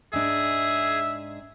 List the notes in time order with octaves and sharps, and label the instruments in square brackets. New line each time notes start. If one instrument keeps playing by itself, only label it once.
[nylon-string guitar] G#2 D4 [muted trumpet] G#4 [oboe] E5